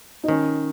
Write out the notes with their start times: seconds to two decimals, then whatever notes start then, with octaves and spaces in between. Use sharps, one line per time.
0.24 D#4
0.28 D#3 C#4